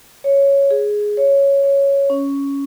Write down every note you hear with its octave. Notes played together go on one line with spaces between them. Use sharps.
C#5
G#4
C#5
C#5
C#4